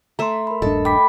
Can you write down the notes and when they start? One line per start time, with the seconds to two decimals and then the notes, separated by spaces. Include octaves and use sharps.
0.19 A3 E5 A#5 C6
0.47 A#4 B5
0.62 D#1 G2 D4 A4 D#5
0.85 G5 B5 D6 B6